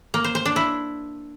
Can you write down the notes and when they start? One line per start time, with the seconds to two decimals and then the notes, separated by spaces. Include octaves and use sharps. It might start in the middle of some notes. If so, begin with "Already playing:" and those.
0.14 A#3
0.24 C5
0.35 C5
0.45 D4
0.56 E4